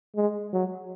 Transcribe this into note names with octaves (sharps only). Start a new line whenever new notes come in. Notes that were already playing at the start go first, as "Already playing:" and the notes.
G#3
F#3